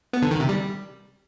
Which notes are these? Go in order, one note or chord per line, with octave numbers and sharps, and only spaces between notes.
B3
D3
D#3
C3
G3